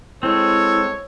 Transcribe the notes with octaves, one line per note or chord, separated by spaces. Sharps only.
G#3 C4 E4 A4 C#5